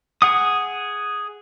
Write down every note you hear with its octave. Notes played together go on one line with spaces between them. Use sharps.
G#4 F#5 D#6